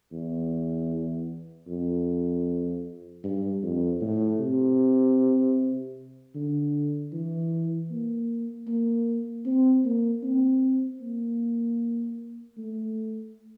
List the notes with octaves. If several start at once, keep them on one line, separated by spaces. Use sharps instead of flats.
E2
F2
G2
F2
A2
C3
D3
E3
A#3
A#3
C4
A#3
C4
A#3
A3